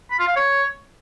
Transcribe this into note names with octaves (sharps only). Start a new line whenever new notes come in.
B5
F4
F5
C#5